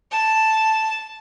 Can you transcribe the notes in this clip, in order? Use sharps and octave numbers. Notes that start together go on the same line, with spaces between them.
A5